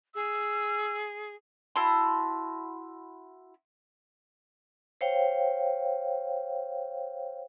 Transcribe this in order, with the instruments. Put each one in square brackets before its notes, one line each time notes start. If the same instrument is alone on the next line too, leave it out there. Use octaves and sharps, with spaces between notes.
[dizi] G#4 [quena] E6
[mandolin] E4 F#4 A5 C6
[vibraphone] C5 C#5 F5 G5